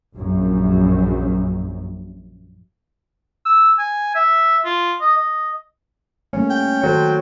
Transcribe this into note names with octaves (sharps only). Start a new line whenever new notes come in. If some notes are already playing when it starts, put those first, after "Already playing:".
A#1 F#2
E6
G#5
E5
F4
D#5
D#5
G3 A3 A#3 C#4
G5
D#3 F#3 A4 C5